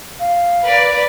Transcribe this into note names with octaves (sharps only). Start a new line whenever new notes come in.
F5
A#4 B4 D5